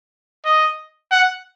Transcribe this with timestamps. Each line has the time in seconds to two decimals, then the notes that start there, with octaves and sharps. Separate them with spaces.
0.45 D#5
1.11 F#5